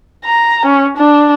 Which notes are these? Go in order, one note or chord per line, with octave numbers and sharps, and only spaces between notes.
A#5
C#4
D4